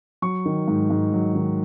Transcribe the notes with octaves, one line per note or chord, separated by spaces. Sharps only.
F#3 C#6
D#3
G#2
G#2
F#3
D#3